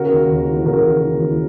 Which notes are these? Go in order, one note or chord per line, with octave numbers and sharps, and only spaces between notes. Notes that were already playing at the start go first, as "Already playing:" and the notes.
Already playing: C#3 F#4 A#4
D#2
D#2
E3
C#3 F#4 A#4
D#2
D#2
E3